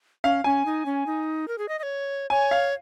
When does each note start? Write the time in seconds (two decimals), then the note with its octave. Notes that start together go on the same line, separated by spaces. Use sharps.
0.24 C#4 F5
0.44 C#4 G#5
0.66 D#4
0.86 C#4
1.06 D#4
1.48 A#4
1.58 G#4
1.69 D#5
1.79 D#5
1.83 C#5
2.30 C#5 G#5
2.51 F5